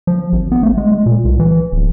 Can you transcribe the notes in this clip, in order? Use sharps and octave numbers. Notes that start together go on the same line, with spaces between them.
F3
G#1
B3
A3
G#3
G#3
A#2
C2
E3
D1